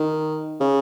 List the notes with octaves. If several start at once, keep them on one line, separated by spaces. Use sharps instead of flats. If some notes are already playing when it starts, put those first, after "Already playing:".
Already playing: D#3
C#3